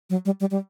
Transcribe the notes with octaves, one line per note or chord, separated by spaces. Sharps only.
F#3
G3
G3
G3